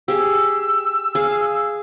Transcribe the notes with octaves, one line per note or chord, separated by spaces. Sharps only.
G4 G#4 E6
G#4 F5